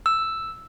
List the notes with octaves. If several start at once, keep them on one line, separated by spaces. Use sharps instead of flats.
E6